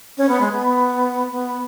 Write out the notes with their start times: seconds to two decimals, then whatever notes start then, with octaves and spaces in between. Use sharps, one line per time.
0.18 C#4
0.29 B3
0.40 G#3
0.51 B3
1.32 B3